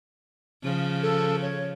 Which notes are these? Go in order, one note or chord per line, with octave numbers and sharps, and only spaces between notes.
C#3 F3
A4
C#5